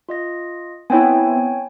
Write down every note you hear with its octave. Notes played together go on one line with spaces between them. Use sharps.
F4 D#5 A#6
B3 C4 E4 C#5 G5 G#5